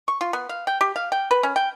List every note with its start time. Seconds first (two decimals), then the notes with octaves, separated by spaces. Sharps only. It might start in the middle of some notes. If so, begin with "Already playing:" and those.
0.08 C#6
0.21 F4
0.33 B3
0.49 F5
0.67 G5
0.81 G4
0.96 F5
1.12 G5
1.31 B4
1.43 C#4
1.56 G5